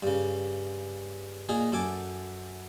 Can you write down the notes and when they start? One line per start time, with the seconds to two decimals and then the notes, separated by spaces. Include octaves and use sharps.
0.03 G2 C#3
1.49 A#2 D#4 G#4
1.72 F#2 A4 G#5 D6